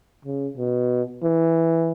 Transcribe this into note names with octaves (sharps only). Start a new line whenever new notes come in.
C#3
B2
E3